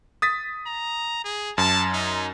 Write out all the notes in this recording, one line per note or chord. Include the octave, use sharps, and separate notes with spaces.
D#6 A6 B6
A#5
G#4
F#2 A5
D#4